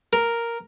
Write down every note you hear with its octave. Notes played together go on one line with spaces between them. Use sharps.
A#4